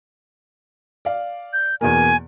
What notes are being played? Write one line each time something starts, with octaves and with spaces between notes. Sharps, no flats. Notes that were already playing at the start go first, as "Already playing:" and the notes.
D5 F5
G6
E2 B2 A#3 G#5